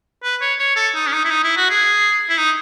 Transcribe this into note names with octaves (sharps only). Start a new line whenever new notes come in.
B4
C#5
C#5
A4
D#4
C#4
D#4
E4
D#4
E4
F#4
G#4
E4
D#4